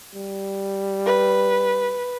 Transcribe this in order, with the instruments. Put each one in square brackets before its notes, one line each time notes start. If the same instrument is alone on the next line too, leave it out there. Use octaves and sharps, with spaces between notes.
[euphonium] G3
[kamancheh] B4